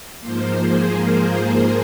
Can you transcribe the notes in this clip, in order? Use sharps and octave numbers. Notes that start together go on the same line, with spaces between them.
G#2 F3 A#3 C5
G#4
A#4